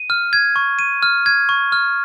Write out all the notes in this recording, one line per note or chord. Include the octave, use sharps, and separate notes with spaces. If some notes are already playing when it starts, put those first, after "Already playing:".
Already playing: D#7
F6
G#6
C#6
D#7
F6
G#6
C#6
F6